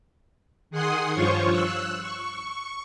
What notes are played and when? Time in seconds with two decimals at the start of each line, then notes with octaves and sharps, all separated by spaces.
0.70 D#3 G#4 F#5 G#5 C6 D#6
1.13 G2 F3 F4 C5 C#5 C#6
1.49 E6 F#6
2.00 C#6